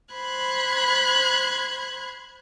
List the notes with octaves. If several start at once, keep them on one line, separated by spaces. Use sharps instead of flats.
C5 B5 F#6 G#6